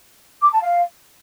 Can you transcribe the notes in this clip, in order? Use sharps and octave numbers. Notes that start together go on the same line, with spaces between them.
D6
A5
F5